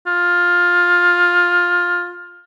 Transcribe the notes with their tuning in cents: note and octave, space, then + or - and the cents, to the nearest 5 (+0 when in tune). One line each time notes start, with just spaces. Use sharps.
F4 +15